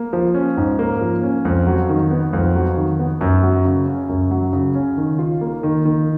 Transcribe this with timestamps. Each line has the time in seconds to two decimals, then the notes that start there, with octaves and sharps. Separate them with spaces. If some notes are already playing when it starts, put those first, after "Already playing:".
Already playing: A#3
0.13 F3
0.35 C#4
0.57 G#2
0.79 A#3
1.01 F3
1.23 C#4
1.45 F2
1.67 F#3
1.89 D#3
2.11 B3
2.33 F2
2.55 F#3
2.77 D#3
2.99 B3
3.21 F#2
3.43 F#3
3.65 C#3
3.87 C#4
4.09 F#2
4.31 F#3
4.53 C#3
4.75 C#4
4.97 D#3
5.19 F4
5.41 A#3
5.63 D#3
5.85 D#3